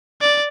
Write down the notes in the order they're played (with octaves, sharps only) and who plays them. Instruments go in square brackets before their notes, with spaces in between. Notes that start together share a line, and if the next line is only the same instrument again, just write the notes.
[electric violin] D5